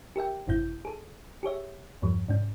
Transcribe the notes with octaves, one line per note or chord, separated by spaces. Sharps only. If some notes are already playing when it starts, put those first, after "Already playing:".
G4 A#4 E5 G5
G#1 F#2 C3 E4 G6
G#4 A4
G4 G#4 C#5 E5
E2 G2 F3 G3
G#2 C3 C#4